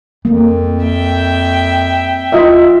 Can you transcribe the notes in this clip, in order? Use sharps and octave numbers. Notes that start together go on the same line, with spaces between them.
F2 A#3
E5 G5
F4 D#5 E5